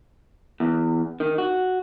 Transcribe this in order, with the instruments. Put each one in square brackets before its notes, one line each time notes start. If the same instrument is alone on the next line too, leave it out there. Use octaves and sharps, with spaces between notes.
[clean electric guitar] E2
D#3
F#4